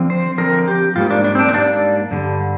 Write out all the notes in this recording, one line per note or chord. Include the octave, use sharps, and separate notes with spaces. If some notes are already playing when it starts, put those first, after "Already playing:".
Already playing: D3 F3 C4
C5
D3 F3 C4 A#4
G4
G#2 G3 A#3 F4
D4
D4
C4
D4
C4
G#2 G3 A#3 D4
G2 D3 G3